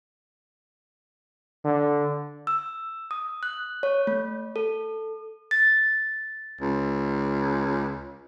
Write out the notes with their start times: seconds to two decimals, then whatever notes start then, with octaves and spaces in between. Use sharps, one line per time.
1.64 D3
2.47 E6
3.11 D#6
3.43 F#6
3.83 C#5
4.07 A3
4.56 A4
5.51 A6
6.61 C#2